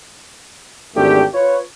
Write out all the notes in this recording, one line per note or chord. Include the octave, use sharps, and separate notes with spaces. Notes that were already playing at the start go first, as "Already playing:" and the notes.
G#1 E2 A3 D4 G4
F4 B4 C#5